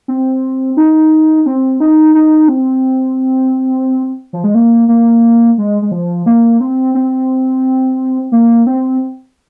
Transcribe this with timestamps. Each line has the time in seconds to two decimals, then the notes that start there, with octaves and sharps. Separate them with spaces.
0.08 C4
0.77 D#4
1.46 C4
1.80 D#4
2.15 D#4
2.48 C4
4.33 F3
4.44 G#3
4.55 A#3
4.88 A#3
5.58 G#3
5.82 G#3
5.91 F3
6.26 A#3
6.61 C4
6.95 C4
8.32 A#3
8.67 C4